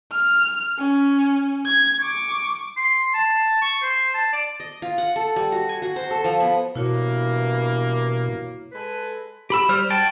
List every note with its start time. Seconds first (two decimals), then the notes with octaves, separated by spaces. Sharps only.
0.12 F6
0.78 C#4
1.65 G#6
2.01 C#6 D6
2.77 C6
3.14 A5
3.62 C#6
3.83 C5
4.14 A5
4.33 D5
4.60 D#5
4.82 F4
4.98 F#5
5.16 A4
5.36 G3
5.52 F#4
5.69 G#5
5.82 F#4
5.96 C5
6.11 A4
6.25 F3
6.40 B3
6.75 G2 B2 E3 A#3 E4 F#4 C#5
8.72 G#3 A4 B4
9.50 G4 B5 E6
9.69 G3 C5 F6
9.90 F#4 G5 A5